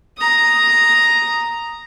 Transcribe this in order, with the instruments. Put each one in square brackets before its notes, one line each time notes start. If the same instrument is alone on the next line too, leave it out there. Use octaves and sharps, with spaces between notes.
[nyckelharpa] A#5 D#6